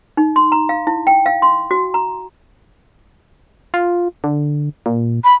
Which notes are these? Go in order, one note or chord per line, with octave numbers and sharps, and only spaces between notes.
D#4
C6
A#5
F5
E4
G5
F5
C6
F#4
A#5
F4
D3
A#2
B5